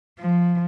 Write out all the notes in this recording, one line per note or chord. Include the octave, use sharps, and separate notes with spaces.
F3